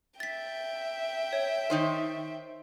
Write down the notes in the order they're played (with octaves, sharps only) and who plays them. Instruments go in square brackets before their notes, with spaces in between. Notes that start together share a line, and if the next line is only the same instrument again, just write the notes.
[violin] E5 G5 [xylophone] A6 B6
[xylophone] C#5
[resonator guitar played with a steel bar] D#3 D#4 C5